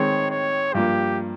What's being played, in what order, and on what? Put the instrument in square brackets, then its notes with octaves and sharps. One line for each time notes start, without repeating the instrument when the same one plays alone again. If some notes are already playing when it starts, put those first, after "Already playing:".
Already playing: [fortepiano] D#3 G#3 C4 [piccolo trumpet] C#5
[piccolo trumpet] C#5
[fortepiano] G2 F3 A#3 [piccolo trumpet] G4